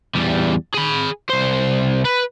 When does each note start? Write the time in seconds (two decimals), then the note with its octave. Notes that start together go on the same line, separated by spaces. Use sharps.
0.15 E2 G3
0.74 G#4 B5
1.30 C2 C5
2.05 B4